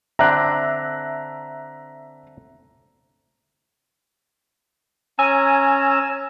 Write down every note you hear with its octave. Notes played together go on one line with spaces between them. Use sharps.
D3 C4 D4 E5 A#5 F#6
C#4 G#5 A#5 E6